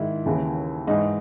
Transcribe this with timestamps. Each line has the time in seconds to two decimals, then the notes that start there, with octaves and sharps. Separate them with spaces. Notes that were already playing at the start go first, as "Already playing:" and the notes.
Already playing: G#2 D#3 E4
0.26 D#2 C#3 E3
0.87 G#2 E3 D#4